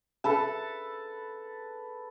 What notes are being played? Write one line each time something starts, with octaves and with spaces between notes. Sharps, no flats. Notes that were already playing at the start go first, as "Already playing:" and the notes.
A4 B4 A5